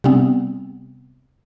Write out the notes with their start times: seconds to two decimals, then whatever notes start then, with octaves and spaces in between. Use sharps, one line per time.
0.04 C3 G3 B3 C4